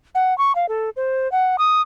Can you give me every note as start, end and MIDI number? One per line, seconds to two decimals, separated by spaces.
0.15 0.36 78
0.38 0.55 85
0.55 0.68 77
0.68 0.90 69
0.96 1.30 72
1.32 1.56 78
1.58 1.81 87